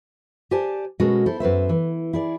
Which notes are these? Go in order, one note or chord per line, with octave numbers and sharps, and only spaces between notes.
G4 C5 D5 G#5 A5
B2 G#3 C#4 F#4 A4 A#4
E4 A4 C5
F#2 B4 C5 E5
E3
E4 G#4 D5